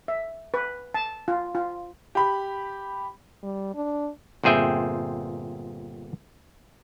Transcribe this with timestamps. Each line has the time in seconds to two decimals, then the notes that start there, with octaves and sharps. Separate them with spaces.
0.08 E5
0.54 B4
0.94 A5
1.28 F4
1.55 F4
2.15 G4 B5
3.43 G3
3.74 D4
4.43 G1 A#2 C4 G#4 E5 G5